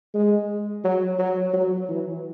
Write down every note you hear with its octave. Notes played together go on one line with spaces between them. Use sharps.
G#3
F#3
F#3
F#3
E3